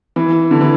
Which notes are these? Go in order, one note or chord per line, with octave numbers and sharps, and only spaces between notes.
E3
D3
E3